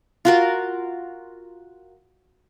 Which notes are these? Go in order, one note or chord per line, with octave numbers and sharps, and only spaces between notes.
F4 F#4 A#4